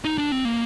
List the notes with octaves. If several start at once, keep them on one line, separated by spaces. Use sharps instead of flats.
D#4
D4
C4
A#3